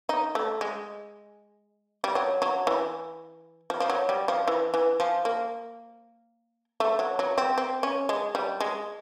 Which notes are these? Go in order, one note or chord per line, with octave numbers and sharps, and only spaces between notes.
D#4
A3
G#3
G3
F#3
F#3
E3
F3
F3
F#3
G3
F3
E3
E3
F3
A#3
A3
F#3
F#3
C4
C4
C#4
G#3
G3
G#3